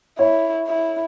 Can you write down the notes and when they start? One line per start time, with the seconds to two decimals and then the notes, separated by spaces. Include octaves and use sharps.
0.19 E4 C#5
0.67 E4